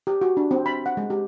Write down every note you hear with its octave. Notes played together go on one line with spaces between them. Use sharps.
G4
F#4
D4
C4
B5
F#5
G#3
G4